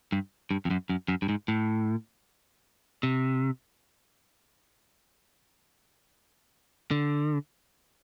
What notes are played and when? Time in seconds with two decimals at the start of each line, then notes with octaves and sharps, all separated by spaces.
0.12 G2
0.51 G2
0.65 F2
0.70 F#2
0.89 F#2
1.08 F#2
1.22 G2
1.29 G#2
1.48 A2
3.03 C3
6.91 D3